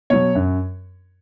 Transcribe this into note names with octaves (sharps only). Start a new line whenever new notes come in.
B2 F#3 C#5
F#2